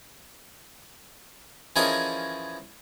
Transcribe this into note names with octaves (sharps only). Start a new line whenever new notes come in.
E3 F3 C#4 G#4 A#4 D#5